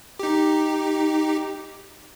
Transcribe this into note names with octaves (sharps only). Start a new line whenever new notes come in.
D#4 G4